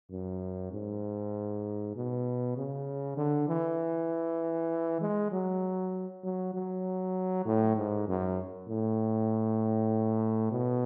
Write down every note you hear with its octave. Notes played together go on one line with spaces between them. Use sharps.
F#2
G#2
B2
C#3
D3
E3
G#3
F#3
F#3
F#3
A2
G#2
F#2
A2
B2